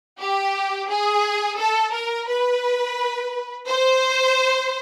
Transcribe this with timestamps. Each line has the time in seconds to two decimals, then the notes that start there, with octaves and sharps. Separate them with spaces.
0.19 G4
0.89 G#4
1.58 A4
1.93 A#4
2.28 B4
3.67 C5